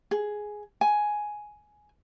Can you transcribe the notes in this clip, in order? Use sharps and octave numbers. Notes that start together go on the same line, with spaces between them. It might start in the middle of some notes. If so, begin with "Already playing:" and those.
G#4
G#5